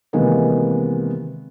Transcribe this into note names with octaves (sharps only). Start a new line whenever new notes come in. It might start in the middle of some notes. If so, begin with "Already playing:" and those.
C3 D#3 E3 G#3 A#3 B3